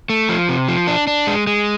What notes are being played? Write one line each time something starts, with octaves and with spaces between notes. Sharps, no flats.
A3
F3
C3
F3
D4
D4
G#3
G#3